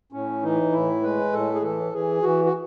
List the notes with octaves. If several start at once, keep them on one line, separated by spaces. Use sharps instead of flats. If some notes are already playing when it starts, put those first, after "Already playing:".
A2 C#4
E3 D#4
A2 E4
G#3 B4
A2 A4
G#4
E3 A4
E3 G#4
E3 F#4
F#4